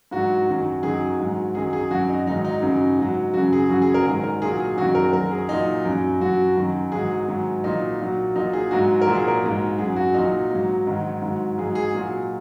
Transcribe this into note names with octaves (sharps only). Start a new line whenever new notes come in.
G#2 F#3 F#4
F#2 D#3 F#3
F#2 D#3 F#3 G#4
G#2 F#3
F#2 D#3 F#3 G#4
G#4
F#2 F#3 F#4
D#4
G#2 D#3 F#3 D#4
D#4
F#2 C#3 F#3
G#2 F#3
F#2 C#3 F#3 F#4
G#4
F#2 C#3 F#3 F#4
G#4
A#4
G#2 D#3 F#3 G#4
A#4
A#2 F#3 G#4
G#4
F#2 D#3 F#3 F#4
A#4
F#2 F#3 A#4
G#4
A#2 F#3 D#4
F#2 F#3
F#2 F#3 F#4
F#2 D#3 F#3
G#2 F#3 G#4
G#2 D#3 F#3
A#2 F#3 D#4
A#2 F#3
A#2 F#3 D#4
G#4
G#2 F#3 F#4
A#4
A#2 F#3
G#4
A#4
G#2 F#3
F#2 F#3 G#4
F#4
A#2 F#3 D#4
G#2 F#3
G#2 D#3 F#3
G#2 F#3
G#2 F#3 G#4
G#4
A#2 F#3